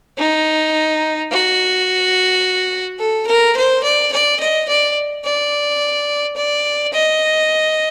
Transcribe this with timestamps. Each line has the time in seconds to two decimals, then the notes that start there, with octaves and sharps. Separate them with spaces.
0.18 D#4
1.31 F#4
2.99 A4
3.27 A#4
3.56 C5
3.83 D5
4.12 D5
4.40 D#5
4.69 D5
5.25 D5
6.36 D5
6.93 D#5